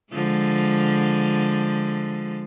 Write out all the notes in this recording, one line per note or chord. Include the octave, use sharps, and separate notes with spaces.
D3 F3 G#3